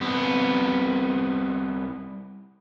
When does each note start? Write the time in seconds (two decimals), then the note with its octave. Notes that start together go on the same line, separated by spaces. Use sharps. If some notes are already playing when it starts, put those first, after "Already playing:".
0.01 C2 B3